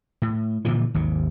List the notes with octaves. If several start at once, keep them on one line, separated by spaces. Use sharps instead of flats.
A2
A#2 D3 E3 F3
G#1 D#2 C3